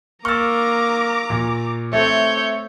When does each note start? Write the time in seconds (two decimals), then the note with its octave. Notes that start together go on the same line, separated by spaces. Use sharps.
0.25 A#3 A#5 C#6 D6 E6 F6 A6
1.30 A#2
1.93 A3 C4 C#5 E5 G6